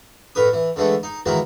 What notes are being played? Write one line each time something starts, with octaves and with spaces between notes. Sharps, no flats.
A2 A#4 B4 D#6
E3
D3 E3 G#3 A3
D#4
D#3 E3 F#3 G#3 A#3 E4